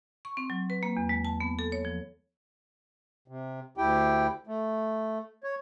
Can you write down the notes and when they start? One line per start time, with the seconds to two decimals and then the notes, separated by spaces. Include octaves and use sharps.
0.25 C#6
0.37 C4
0.50 F#3
0.70 B4
0.83 A#3
0.97 E2
1.09 G#3
1.25 A5
1.40 B3
1.59 A4
1.72 C#5
1.85 F3
3.28 C3
3.78 D2 E4 G4 G5
4.47 A3
5.44 C#5